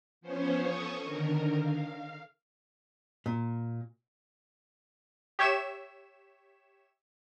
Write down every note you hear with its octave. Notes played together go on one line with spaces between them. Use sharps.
F3 B3 C#4 C5 C#5
A4 C#6 D#6
D3 D#3 A#4
F5
A#2
G4 C#5 E5 E7